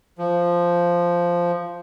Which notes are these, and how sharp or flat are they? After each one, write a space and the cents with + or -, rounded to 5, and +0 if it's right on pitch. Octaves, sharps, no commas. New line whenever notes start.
F3 -5